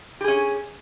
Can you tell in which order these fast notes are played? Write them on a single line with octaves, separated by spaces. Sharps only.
G4 G#4 C#4